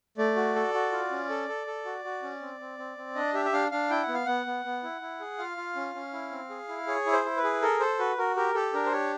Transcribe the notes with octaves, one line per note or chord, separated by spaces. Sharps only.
A3 D5
F#4
A4
F#4
F4
C#4
A4
A4
A4
F#4
F#4
C#4
C4
C4
C4
C4
D4 D#5
G4 E5
E5
D4 F5
D4 F5
E4 G5
F#5
B3
F5
B3 F#5
B3
B3
E4
E4
G#4
F4 F5
F4
C#4
C#4
E4
C4
G#4
E4
G#4 C#5
E4
C5
E4
B4
G#4
A4 A#4
A4 C5
F#4 B4
F#4 A#4
G4 A#4
G4 A4
D4 A#4
C5
G4 C#5